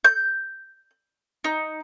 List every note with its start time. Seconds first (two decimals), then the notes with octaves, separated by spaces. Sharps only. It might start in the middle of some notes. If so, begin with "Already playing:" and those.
0.05 G6
1.44 D#4